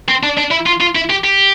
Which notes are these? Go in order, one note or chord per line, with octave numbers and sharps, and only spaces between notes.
C4
D4
D4
E4
F4
F4
E4
G4
G4